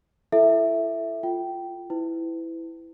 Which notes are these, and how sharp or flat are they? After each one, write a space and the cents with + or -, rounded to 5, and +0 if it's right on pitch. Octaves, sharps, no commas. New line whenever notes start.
E4 +30 A4 +0 E5 +0
F4 +0 G5 -15
E4 +0 B4 +35